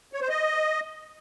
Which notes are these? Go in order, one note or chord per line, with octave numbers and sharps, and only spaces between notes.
C#5
C5
D#5